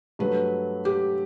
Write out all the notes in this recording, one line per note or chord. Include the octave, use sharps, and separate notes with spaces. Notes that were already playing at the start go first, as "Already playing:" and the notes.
G2 F#3 A3 B4
G4